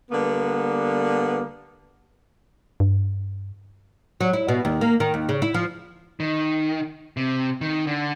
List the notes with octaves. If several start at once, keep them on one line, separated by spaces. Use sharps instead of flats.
D3 G3 A#3 B3
G2
F#3
E4
B2
D#2
A#3
D#3
D#2
C#3
E4
F3
D#3
C3
D#3
D3